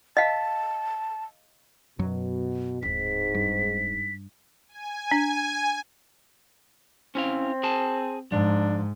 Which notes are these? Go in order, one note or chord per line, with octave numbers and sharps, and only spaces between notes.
D#5 F5 A5
F#2 B2 F#3
D1 G#2 C4 B6
G2
G#5
D4
C4 C#4 E4 F5
G#4 G#5 A5
G#2 F3 D4